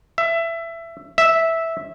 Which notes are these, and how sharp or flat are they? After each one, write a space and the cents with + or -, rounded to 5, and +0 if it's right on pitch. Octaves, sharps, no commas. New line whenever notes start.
E5 +20
E5 -5